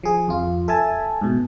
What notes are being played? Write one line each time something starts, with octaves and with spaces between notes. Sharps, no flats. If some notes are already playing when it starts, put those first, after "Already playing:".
F3 G#4
F2 F4
A4 E5 G#5 A5
G#2 B2